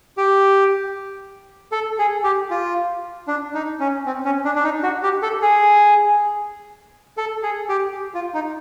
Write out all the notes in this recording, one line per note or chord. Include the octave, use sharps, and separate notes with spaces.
G4
A4
G#4
G4
F4
D4
D#4
C#4
C4
C#4
D4
D4
D#4
F#4
G4
A4
G#4
A4
G#4
G4
F4
D#4